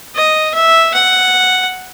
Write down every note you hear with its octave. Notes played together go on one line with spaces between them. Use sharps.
D#5
E5
F#5